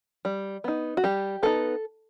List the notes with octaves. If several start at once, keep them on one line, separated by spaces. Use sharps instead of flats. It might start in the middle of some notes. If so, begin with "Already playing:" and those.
G3
B3 D#4
F#4
G3 G4
B3 D#4 A4